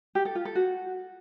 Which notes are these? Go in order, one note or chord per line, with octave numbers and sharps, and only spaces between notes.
G4
A4
F4
A4
F#4